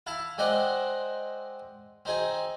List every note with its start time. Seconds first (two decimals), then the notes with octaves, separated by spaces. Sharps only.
0.07 E4 F5 A5
0.38 G#3 C4 C5 D5 D#5 F#5
2.05 C4 D#4 G#4